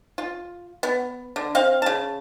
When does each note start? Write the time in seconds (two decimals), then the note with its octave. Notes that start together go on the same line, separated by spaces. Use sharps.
0.18 F4
0.83 B3
1.36 D3
1.55 C4 F5
1.82 C#3 A5